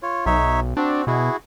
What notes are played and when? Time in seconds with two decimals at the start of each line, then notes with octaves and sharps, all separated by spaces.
0.02 F4 C#5
0.26 B1 D#4 C#5 E5
0.77 C4 D4 F#4
1.07 B2 E4 F#4 G#4